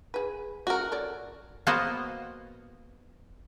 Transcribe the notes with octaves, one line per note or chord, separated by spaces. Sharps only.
G#4 B4
C#3 F#4 A#4
A4 C#5 D5
A#3 B3 F#4 C5 D#5 A#5